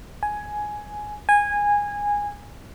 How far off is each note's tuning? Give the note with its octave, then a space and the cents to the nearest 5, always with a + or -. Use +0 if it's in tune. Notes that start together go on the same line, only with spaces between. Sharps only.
G#5 +10
G#5 -15